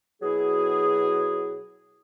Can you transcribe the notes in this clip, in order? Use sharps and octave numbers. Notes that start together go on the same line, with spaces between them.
B2 F#3 E4 G#4